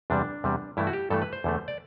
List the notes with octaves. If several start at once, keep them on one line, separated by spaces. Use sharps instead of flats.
E2 C3 G3 D4
E2 C3 G3
G2 E3 A3 E4
F#4
G4
G2 E3 A3 A4
B4
C5
E2 D3 A3
D5